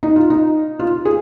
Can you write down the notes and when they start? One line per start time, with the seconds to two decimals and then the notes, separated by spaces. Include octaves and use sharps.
0.03 D#4
0.16 F4
0.30 D#4
0.79 F4
1.05 G#4